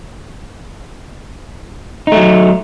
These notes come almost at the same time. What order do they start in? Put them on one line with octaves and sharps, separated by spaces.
D#4 A3 F#3